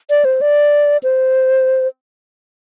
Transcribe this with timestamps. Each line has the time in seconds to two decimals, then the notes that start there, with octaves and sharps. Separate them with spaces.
0.10 D5
0.25 C5
0.41 D5
1.03 C5